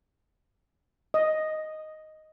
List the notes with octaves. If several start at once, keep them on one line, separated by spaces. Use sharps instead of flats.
D#5